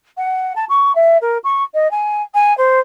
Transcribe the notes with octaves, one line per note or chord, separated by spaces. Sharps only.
F#5
A5
C#6
E5
A#4
C#6
D#5
G#5
G#5
C5